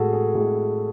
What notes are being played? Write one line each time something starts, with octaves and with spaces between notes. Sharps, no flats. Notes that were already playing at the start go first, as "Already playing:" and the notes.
Already playing: A2 G#3 F#4 G#4 A4
G#4
A2 G#3 F#4